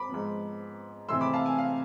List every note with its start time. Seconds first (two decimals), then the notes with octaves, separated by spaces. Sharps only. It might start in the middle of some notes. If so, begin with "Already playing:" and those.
Already playing: B5 D6
0.09 G#2 F3 B3
1.09 C3 E3 A3 C6 E6
1.21 B5 D6
1.33 F5 A5
1.46 G#5
1.58 F5